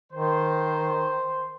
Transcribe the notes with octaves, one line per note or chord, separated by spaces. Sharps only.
D#3 C5